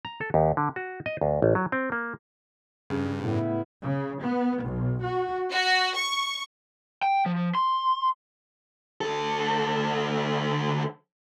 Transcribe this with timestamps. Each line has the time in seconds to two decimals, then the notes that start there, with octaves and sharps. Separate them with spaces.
0.05 A#5
0.21 A4
0.34 D#2
0.57 D3
0.76 F#4
1.06 D#5
1.21 D2
1.42 A1
1.55 F#3
1.72 C4
1.92 A#3
2.90 G2 C#3
3.22 A2 B3 E4
3.83 C#3
4.20 B3
4.62 B1
5.03 F#4
5.51 F#4
5.96 C#6
7.03 G5
7.26 F3
7.55 C6
9.01 D2 A4